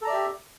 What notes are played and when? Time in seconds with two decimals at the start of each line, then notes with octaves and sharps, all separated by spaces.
0.02 A4
0.04 A#5
0.07 D5
0.10 E5
0.13 G4